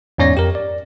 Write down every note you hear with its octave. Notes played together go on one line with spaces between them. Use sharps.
E2 G#2 C#4 C#5 D5 A#6
F2 G4 A#4
D5